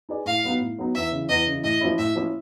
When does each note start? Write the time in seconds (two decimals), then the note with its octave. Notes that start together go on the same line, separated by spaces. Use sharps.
0.09 D#4 G#4 B4 D5
0.26 A2 F5
0.44 F#3 B3 D#4
0.60 A2
0.78 F#3 B3 D#4
0.95 E2 E5
1.12 C#3 E3
1.29 E2 D#5
1.47 C#3 E3
1.64 A2 D#5
1.81 F3 A#3 C#4 E4
1.99 A2 E5
2.15 F3 A#3 C#4 E4